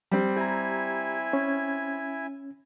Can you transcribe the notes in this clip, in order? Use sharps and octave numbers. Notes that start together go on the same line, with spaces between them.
G3 C4
E4 G4 G#5 A#5
C#4